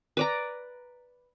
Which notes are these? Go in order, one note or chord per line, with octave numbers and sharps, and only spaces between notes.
B4 D5 A#5